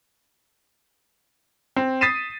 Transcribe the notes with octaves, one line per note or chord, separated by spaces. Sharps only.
C4
D#6 A6 B6 C7 D#7 E7